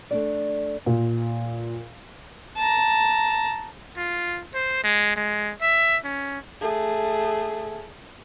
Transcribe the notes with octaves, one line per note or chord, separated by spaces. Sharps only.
A3 D4 D5
A#2
A5 A#5
F4
C5
G#3
G#3
E5
C#4
A3 G#4